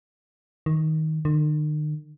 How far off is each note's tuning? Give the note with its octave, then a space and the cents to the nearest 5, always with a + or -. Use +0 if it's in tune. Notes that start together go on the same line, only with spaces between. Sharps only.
D#3 +15
D#3 -45